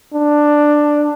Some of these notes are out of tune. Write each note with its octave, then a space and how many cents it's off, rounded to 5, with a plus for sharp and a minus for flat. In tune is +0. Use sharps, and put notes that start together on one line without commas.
D4 +10